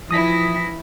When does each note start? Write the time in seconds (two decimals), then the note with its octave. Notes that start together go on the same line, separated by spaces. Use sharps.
0.11 E3 F3 E4 D#6 A#6 B6